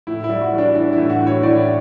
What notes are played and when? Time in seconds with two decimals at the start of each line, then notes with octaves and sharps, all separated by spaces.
0.07 A2 E4
0.24 E4
0.30 G3
0.41 F#4
0.53 E3
0.58 D4
0.75 E3 D4
0.93 E4
0.98 A2
1.10 F#4
1.21 A2
1.27 C#5
1.43 A2 D5